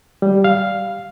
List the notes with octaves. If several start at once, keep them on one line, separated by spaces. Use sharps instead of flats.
G3
F5